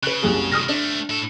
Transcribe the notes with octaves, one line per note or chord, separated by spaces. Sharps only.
C#3 B4 F#6
F#1 C2 G#4
C2 A2 D#6 F6 A#6
A3 C4 D4
A2 A4